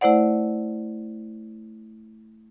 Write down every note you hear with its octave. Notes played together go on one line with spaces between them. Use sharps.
A3 E4 C5 D5 F#5